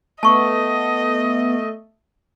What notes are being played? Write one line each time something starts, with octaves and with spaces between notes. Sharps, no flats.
A3 B3 D#5 A5 C#6